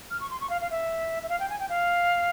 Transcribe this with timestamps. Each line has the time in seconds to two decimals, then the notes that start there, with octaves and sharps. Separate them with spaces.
0.10 F6
0.20 C#6
0.30 C6
0.41 C#6
0.50 F5
0.61 F5
0.71 E5
1.23 E5
1.29 F5
1.40 G5
1.50 G#5
1.59 G5
1.69 F5